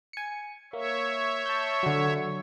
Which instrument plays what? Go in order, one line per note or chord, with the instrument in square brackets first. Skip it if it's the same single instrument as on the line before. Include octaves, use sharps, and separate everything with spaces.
[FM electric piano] G#5 C#7
[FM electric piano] A#3 [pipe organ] C#5 E5
[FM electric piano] A5 G6
D3 F#3